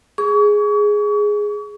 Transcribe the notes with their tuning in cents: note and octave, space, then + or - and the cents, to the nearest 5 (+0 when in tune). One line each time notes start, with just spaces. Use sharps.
G#4 +0 C#6 +35